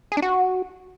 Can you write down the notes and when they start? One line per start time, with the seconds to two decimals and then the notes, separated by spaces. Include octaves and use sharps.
0.12 G#4
0.17 D4
0.22 F#4